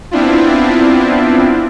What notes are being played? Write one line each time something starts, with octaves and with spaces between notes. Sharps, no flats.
B3 C4 D4 E4 F4